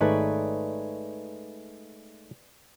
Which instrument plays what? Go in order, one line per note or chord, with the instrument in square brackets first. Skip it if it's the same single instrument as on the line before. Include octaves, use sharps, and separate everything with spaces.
[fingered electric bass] G#1 [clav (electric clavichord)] G#3 A3 D#4 [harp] B4 C#5 D5